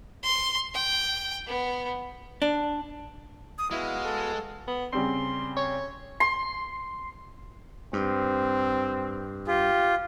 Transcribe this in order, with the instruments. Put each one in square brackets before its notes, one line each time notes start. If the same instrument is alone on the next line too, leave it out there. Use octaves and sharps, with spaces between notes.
[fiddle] C6
G5
B3
[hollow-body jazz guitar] D4
[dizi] D#6
[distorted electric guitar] G#3 [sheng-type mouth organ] B3 F#4 F5 [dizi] E4
[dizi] A4
[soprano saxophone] B3
[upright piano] C#3 G3 C4 [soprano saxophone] C6
[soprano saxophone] C#5
[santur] C6
[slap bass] G2 [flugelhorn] C4
[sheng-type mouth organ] F4 [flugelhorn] G4